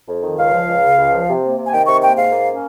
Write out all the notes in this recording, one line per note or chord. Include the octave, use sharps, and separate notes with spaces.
F2
D#3
C#2 F5
F3
C#2
C#3
C#2
F3
C3
A#3
C3
G#5
D#3 G5
C3 C#6
A#3 G5
G#2 F5
A#3
C#4